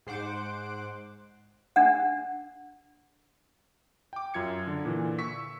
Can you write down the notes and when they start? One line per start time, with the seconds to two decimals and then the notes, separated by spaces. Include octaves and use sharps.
0.07 G#2 C5 F#5 D6
1.76 D4 F#5
4.13 G5 D6
4.34 F#2 F4 G#6 C#7
4.67 D3
4.85 A#2 D3 E3
5.19 C#6 E6 B6